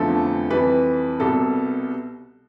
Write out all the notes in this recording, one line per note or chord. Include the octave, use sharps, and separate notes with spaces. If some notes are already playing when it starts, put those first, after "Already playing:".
Already playing: F1 E2 D3 F3 A3 A4
F2 E3 G3 B4
C2 B2 G3 A4